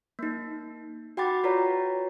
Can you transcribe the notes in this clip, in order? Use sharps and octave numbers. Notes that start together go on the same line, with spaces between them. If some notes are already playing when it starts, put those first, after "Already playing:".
A#3 D#4
F#4 F#5 G5 B5 D6 A6
F4 F#4 B4 C#5 D5 A#5